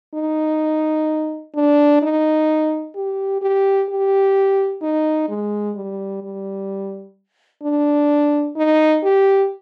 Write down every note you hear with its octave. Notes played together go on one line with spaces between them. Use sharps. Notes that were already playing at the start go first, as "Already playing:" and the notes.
D#4
D4
D#4
G4
G4
G4
D#4
G#3
G3
G3
D4
D#4
G4